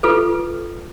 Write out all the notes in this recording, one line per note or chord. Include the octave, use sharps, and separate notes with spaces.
F4 A4 B4